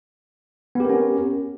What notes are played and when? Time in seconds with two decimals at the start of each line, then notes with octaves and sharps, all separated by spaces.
0.75 B3
0.80 G4
0.85 A#4
0.89 C#4